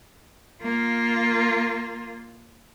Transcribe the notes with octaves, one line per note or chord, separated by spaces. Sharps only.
A#3 F4